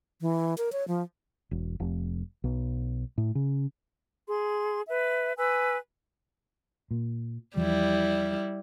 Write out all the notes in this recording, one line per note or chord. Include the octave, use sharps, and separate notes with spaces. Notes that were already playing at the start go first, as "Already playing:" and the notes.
E3
A#4
C#5
F3
E1
F1
B1
A2
C#3
G#4 C6
B4 E5
B4 G#5 E6
A#2
E2 F3 G3 E4